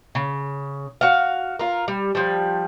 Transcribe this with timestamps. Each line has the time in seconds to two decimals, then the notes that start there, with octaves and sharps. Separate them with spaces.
0.15 C#3
1.01 F#4 F5
1.59 F4 A#4
1.88 G3
2.15 F3 G3